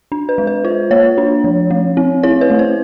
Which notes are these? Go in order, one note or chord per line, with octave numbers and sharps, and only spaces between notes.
D4
B4
G#3
B4
F4 C5
A#3 C#5
D4
F3
A3
C4
E4 C#5
B4
A3
C5